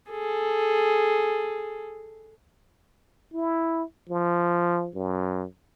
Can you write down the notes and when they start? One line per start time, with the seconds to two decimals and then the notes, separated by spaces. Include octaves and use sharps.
0.11 G#4 A4
3.34 E4
4.09 F3
4.95 F#2